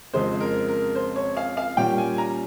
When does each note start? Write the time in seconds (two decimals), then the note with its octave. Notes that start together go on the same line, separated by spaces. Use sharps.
0.13 F2 C#3 G#3 C4 C5
0.40 A#4
0.69 A#4
0.95 C5
1.16 C#5
1.37 F5
1.57 F5
1.77 A#2 G3 C#4 G5
1.98 G#5
2.18 A#5